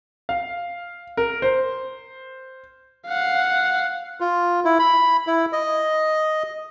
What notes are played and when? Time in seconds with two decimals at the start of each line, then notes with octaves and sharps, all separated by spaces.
0.29 F5
1.17 A#4
1.42 C5
3.07 F5 F#5
4.20 F4
4.65 E4
4.79 B5
5.27 E4
5.53 D#5